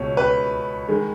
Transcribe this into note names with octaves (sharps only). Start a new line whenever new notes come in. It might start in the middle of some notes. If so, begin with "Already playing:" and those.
Already playing: C#2 B2 C#5
B4
D#3 G#3